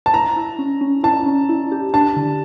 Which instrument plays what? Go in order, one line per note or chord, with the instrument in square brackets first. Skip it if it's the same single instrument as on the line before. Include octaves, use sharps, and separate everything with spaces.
[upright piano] A5
[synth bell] E4 [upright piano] A#5
[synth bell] E4
C#4
C#4
[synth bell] E4 [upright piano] A5
[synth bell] C#4
E4
G4
[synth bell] D4 [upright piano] A5
[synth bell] D3